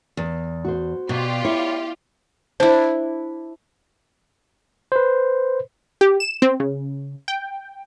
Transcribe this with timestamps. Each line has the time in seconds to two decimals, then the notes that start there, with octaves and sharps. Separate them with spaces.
0.17 E2
0.65 F#4 C5
1.09 B2 F4 G4 D5
1.45 E4 C#5
2.60 D4 E4 C5
4.92 B4 C5
6.01 G4
6.20 E7
6.42 C4
6.60 C#3
7.28 G5